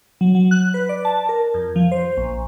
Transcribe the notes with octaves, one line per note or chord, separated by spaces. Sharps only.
F#3
F#3
F#6
B4
D5
A5
A#4
F2
F3
C5
A#1